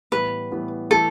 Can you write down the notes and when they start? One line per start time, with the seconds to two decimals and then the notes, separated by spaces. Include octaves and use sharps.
0.12 A2 E3 G3 B3 B4
0.51 A2 E3 G3 B3
0.91 E3 A3 A4